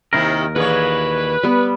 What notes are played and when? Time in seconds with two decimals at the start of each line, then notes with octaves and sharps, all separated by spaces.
0.13 D#2 G#2 C3 D#3 E4 A#4
0.56 A#2 E3 G#4 B4 C#5
1.43 G3 B3